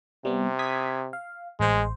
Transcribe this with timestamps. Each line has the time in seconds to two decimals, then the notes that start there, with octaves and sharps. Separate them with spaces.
0.25 C3 G3 B3
0.59 D#6 G#6 B6
1.13 F5
1.60 A1 G#3 C5